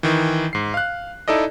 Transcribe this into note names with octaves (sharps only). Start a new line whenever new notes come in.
D#3 E3
G#2 C7
F5 F#6
D#4 E4 A4 D5 D#5